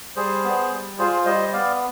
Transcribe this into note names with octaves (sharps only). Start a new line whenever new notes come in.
G3 G#4 C5
B3
G3
F4 G#4 C5
G3 C5 D#5
B3 D5 F5